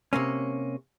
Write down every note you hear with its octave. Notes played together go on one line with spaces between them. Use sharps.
C3 A#3 C#4